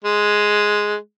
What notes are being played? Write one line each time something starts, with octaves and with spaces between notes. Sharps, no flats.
G#3